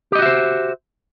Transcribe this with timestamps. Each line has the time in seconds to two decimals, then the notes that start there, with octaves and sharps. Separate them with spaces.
0.12 G4
0.15 D#5
0.19 F#4
0.22 E5
0.26 C5